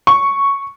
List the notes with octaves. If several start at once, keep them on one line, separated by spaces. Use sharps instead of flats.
C#6